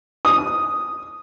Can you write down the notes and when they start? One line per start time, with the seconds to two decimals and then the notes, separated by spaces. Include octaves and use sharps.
0.25 D#6